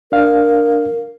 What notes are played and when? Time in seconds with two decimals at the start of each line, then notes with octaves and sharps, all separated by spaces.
0.12 D4 A#4 F5